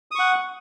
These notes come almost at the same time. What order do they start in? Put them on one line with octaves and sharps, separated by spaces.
D#6 C#6 F#5